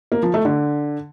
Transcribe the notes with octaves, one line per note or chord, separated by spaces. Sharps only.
A#3
F3
A3
D3